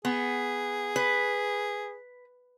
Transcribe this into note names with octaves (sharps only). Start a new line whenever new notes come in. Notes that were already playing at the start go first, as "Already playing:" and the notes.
B3 G#4
B4